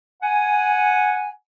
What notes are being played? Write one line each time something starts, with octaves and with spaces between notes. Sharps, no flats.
F#5 G#5